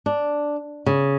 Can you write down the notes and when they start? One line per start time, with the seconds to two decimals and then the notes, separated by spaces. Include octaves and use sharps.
0.06 D4
0.86 C#3